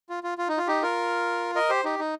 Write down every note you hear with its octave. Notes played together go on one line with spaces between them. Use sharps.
F4
F4
F4
D#4
F4
D#4 G4
F4 A#4
A#4 D#5
G4 C5
D#4 G4
D#4